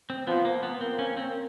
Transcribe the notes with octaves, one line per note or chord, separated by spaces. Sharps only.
C4
F3 B3
A#3
B3
A#3 C4
C#4
C4